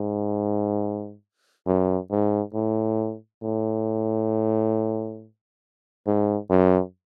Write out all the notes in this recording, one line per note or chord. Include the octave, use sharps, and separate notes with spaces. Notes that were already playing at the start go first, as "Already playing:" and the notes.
Already playing: G#2
F#2
G#2
A2
A2
G#2
F#2